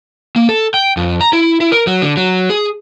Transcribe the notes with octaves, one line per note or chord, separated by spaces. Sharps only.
A#3
A4
G5
F2
A#5
E4
E4
A#4
F#3
D3
F#3
G#4